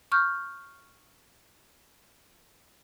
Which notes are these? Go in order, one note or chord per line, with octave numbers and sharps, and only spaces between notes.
C#6 F6 G6